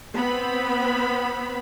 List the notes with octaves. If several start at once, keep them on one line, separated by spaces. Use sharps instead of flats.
B3 C4 B5